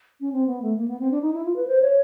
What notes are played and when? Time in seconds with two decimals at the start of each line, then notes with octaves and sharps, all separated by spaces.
0.21 C#4
0.32 C4
0.47 B3
0.62 A3
0.77 A#3
0.88 B3
1.00 C4
1.11 D4
1.22 D#4
1.33 E4
1.45 F4
1.56 B4
1.67 C5
1.82 C#5